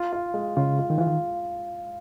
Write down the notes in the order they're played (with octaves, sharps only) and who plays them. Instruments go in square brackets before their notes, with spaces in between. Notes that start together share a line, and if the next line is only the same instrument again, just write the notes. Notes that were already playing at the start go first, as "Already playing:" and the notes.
Already playing: [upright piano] F4
F4
G#3
[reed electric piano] C#3 [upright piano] F4
[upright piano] F4
[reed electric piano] D#3
[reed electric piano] E3 [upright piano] F4
[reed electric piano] D#3